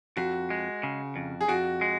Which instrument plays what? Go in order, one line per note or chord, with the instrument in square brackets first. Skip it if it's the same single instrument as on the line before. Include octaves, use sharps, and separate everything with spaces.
[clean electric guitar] F2 [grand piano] F#4
[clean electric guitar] G#3
C#3
F2
[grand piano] G#4
[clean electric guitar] F2 [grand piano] F#4
[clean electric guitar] G#3